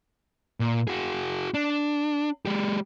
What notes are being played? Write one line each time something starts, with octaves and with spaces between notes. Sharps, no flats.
A#2
F#4 G#4
D4
G#3 G4